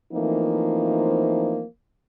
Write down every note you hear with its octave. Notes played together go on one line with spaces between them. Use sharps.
E3 F3 A3 A#3 C4 D#4